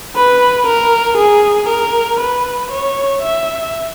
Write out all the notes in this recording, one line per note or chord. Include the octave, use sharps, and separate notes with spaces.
B4
A#4
G#4
A#4
B4
C#5
E5